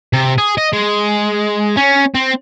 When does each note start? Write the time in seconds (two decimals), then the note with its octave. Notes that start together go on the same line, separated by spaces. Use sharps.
0.13 C3
0.38 G#4
0.58 D#5
0.73 G#3
1.77 C#4
2.15 C4